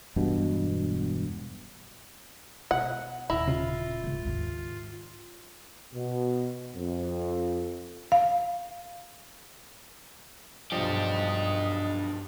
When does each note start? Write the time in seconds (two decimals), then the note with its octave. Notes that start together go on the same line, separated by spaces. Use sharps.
0.16 E1 G2 B2
2.71 B2 F#5
3.30 D#1 E4 A#5
3.48 C#3 F4
4.04 C#2 G#2
4.25 D#2 G#2
5.94 B2
6.75 F2
8.12 F5
10.72 B1 G2 F3 D4 G4 D#5